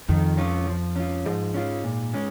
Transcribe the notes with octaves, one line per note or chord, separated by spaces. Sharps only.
F2 D#3
C#4 F4
F3
C#4 F4
G#2 F3
C#4 F4
A#2
G#3 C#4